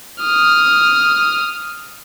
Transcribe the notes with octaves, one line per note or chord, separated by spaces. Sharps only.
D#6 F6